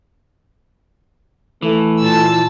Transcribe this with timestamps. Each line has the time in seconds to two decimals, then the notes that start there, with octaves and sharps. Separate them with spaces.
1.62 E3 A3
2.00 A#2 A5 E6